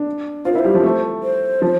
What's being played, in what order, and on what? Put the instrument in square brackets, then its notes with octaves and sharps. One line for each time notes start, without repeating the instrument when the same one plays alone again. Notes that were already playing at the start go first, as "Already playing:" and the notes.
Already playing: [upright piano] D4
[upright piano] F4 [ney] C5
[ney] A#4
[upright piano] E4
[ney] C5
[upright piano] G3
F3
A3
[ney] C5
[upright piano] F3